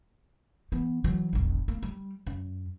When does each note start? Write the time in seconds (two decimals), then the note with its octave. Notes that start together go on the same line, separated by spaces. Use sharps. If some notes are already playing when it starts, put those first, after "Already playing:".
0.72 E3 B3
1.04 E3 F#3
1.33 E1 A#1
1.68 A#3
1.82 G3
2.27 F#2